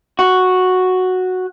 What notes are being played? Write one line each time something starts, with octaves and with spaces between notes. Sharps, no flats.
F#4